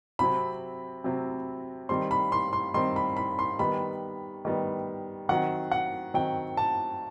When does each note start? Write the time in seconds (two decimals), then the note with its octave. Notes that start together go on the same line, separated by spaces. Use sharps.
0.19 C3 F#3 C4 B5
1.04 C3 F#3 C4
1.89 D#3 G3 C4 C6
2.11 B5
2.32 C6
2.53 C6
2.74 D#3 G3 C4 C6
2.96 B5
3.17 B5
3.39 C6
3.59 D#3 G3 B3 B5
4.45 D#3 G3 B3
5.29 D#3 F#3 C4 F#5
5.72 F#5
6.14 D#3 F#3 C4 G5
6.57 A5